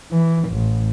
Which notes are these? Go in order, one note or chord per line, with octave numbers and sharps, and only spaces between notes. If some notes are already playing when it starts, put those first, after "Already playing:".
E3
A1